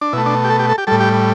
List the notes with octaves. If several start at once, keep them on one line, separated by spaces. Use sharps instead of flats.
D4
B2 A3 E4
D4
G4
A4
G4
A4
G4
A2 G3 A4
G4